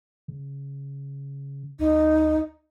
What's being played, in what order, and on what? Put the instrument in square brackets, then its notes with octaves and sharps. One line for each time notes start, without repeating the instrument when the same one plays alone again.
[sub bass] C#3
[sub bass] D2 [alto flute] D#4